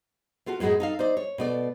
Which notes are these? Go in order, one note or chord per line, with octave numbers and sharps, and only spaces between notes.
A3 F4 F#4 A4
F#2 A2 G#3 F#4 G#4 A#4
D#4 A4 F5
D#4 C5 D5
C#5
B2 A3 D5